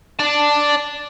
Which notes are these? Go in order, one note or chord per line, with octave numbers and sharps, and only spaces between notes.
D5 A5